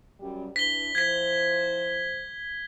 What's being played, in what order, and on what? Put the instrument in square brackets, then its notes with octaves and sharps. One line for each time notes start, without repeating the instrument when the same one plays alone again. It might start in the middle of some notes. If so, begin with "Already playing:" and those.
[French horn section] F#2 G3
[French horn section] D4 E4 B4 [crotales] B6 G7
[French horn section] F3 E4 C5 [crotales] G#6 B6